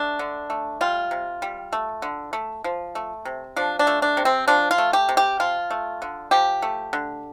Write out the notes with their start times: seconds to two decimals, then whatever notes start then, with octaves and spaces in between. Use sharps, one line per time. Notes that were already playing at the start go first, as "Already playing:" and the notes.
Already playing: A3 D4
0.19 D3
0.50 A3
0.81 G3 F4
1.11 C3
1.42 G3
1.73 A3
2.02 D3
2.33 A3
2.64 F3
2.95 A3
3.25 C3
3.56 F3 D4
3.79 D4
3.87 A3
4.02 D4
4.17 C3
4.25 C4
4.48 F3 D4
4.71 F4
4.78 A3
4.93 G4
5.09 C3
5.17 G4
5.40 F3 F4
5.70 A3
6.02 D3
6.31 F3 G4
6.62 A3
6.93 D3